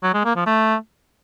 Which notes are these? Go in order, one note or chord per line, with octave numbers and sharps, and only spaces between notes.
F#3
G#3
A#3
F3
A3